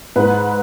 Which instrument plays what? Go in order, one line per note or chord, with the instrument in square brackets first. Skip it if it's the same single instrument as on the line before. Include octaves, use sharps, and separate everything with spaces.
[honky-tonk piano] G#2 B4